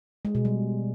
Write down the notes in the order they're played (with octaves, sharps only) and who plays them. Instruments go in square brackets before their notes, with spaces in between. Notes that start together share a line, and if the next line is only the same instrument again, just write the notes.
[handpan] G#3
B2
G3